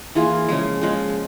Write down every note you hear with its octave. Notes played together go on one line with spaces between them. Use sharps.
E3 A#3 F4 G#4
C#3 F3 G#3
C#3 F3 G#3